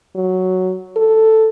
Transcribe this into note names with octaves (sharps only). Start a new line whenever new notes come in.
F#3
A4